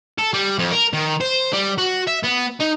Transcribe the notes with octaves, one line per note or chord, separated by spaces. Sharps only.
A4
G3
F2
A#4
D#3
C5
G3
F#4
E5
B3
D#4